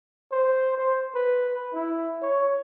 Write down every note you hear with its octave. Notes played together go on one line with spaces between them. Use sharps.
C5
C5
B4
E4
C#5